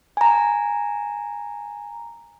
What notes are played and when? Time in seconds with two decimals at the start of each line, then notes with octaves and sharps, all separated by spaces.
0.17 G#5 A#5